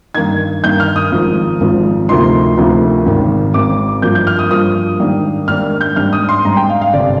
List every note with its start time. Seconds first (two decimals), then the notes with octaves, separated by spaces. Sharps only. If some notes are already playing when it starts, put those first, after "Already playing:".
0.15 G2 D#3 A#3 D#4 G#6
0.64 G2 D#3 A#3 D#4 G6
0.80 F6
0.96 D#6
1.12 G#1 G#2 F3
1.60 G#1 G#2 F3
2.09 D2 C3 F3 A#3 D#4 C6
2.57 D2 C3 F3 A#3 D#4
3.06 G#1 G#2 D#3
3.54 G#1 G#2 D#3 D6
4.02 G2 F3 A#3 G6
4.15 G6
4.27 F6
4.39 D#6
4.51 G2 F3 A#3 D#6
4.99 G#2 D#3 G3 A#3 D4
5.48 G#2 D#3 G3 A#3 D4 F6
5.81 G6
5.96 G#2 G3 D4 F6
6.13 D#6
6.29 C6
6.45 G#2 G3 D4 A#5
6.57 G5
6.69 F5
6.81 F5
6.94 G1 C3 D5